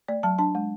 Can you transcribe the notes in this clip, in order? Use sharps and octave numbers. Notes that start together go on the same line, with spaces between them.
A3 D5
F#3 A5
D4 A5
G#3